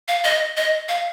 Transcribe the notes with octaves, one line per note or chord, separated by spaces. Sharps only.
F5
D#5
D#5
F5